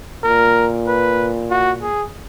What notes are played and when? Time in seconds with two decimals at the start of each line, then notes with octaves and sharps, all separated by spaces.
0.24 A#2 A#4
0.87 B4
1.50 F#4
1.82 G#4